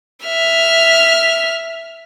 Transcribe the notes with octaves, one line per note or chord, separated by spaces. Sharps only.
E5 F6